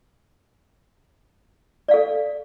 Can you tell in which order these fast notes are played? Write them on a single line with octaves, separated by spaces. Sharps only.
D5 F5 A4